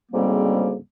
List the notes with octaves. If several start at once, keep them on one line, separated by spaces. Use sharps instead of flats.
D2 G#2 C#3 G3 A#3 C4